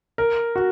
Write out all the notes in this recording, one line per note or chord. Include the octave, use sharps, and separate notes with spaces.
A#4
F#4